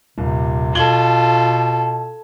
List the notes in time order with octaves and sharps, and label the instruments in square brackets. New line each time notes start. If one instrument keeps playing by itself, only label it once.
[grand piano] D#1 [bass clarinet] C3
[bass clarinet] B2 [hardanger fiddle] F4 A4 [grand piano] G#6 F#7 G7